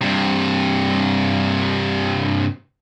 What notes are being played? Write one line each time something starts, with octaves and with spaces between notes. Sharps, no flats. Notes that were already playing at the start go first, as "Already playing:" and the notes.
G2 C3